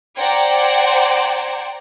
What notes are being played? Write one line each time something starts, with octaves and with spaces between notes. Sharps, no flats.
C5 D5 F#5 G5 A#5 G#6